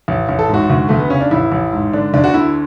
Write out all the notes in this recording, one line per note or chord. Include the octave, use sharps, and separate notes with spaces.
A1
A1
A4
G#2 F#4
D2
D2 A3
B3
C#3 C#4
D4
A1 E4
A1
G#2
D3 D4
D2 D4
F#4
D3 E4